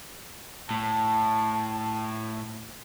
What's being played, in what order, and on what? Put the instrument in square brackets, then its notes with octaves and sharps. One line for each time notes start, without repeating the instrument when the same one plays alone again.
[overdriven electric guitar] A2 [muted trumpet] A5